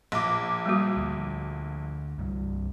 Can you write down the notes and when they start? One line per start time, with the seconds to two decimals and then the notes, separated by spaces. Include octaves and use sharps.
0.12 A#1 D6
0.66 G3 A#3 F#4
0.97 D2
2.18 C2 G2 G3